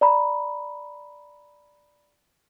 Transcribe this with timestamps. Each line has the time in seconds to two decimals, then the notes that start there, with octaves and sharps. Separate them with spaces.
0.01 D5 A#5 B5